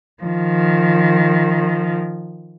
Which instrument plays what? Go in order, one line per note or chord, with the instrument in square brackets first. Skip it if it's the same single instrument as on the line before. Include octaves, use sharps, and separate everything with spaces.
[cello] D#3 F3